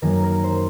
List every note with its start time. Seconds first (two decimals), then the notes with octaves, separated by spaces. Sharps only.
0.02 F#2 D#3 A#3 A#4
0.24 A#4
0.44 C5